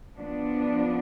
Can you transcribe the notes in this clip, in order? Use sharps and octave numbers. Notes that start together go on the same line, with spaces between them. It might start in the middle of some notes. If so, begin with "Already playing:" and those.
F3 B3 D4